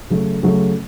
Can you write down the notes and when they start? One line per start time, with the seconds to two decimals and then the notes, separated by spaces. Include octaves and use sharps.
0.10 C#3 F#3 A3
0.43 C#3 F#3 A3